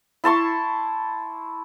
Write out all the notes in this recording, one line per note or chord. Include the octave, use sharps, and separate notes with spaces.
E4 A5 C6 C#6